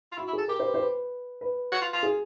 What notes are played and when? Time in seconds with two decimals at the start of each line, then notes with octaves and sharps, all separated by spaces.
0.12 F4
0.17 E4 F#4
0.28 E4
0.33 G#4 A4
0.48 G4 A#4
0.59 C5
0.64 B4
0.74 C5
0.79 B4
1.41 B4
1.72 F#4
1.82 F4
1.93 F4
2.03 G#4